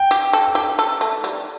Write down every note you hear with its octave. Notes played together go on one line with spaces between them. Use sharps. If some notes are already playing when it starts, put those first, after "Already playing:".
Already playing: G5
G4
A4
G4
A4
A3
G3